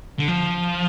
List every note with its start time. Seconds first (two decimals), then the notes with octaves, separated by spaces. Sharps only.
0.19 D3
0.28 F3